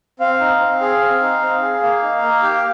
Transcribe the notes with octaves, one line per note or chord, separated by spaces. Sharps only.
C4 F5
D#4
C4
G#4
C4
D#4
C4
G#4
A#3 F5
D#4
A#3
G4
G5